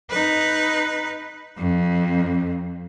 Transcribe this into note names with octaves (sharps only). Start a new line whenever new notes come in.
D#4 B4
F2